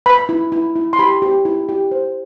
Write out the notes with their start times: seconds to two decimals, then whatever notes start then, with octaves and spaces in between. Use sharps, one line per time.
0.06 B4 B5
0.29 E4
0.52 E4
0.76 E4
0.93 C6
0.99 G4 B5
1.22 G4
1.45 E4
1.69 G4
1.91 C5